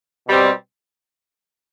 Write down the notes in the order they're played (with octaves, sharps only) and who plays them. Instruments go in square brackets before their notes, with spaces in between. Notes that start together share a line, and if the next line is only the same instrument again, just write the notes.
[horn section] B2 G3 C4